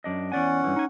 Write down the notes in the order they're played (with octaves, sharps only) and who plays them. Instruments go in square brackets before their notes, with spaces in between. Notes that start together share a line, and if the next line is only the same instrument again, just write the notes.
[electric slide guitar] F#2 D4 D#5
[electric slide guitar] E2 D5 G#5 [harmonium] C#4 F#5
[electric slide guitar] G2 E3
D#4 G#5